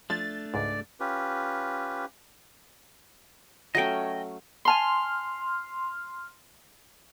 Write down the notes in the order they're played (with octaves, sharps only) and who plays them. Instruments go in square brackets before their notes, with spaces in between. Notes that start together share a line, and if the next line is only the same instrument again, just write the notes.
[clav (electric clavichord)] F3 [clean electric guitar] A3 D4 [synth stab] A6
[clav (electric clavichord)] C#2 G#2 [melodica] D5
[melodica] C#4 F4 G4 B4
[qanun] F#3 A3 C#4 [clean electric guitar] D#5 G5
[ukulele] G#5 A5 B5 [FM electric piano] C6 F6